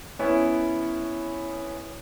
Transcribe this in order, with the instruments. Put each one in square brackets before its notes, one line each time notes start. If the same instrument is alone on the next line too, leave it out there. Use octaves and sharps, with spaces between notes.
[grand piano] B3 C#4 E4